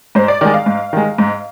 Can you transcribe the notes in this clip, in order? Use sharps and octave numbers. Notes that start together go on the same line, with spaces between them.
G#2 C5
D5
D#3 G#3 D5
F5
G#2
D#3 G#3
G#2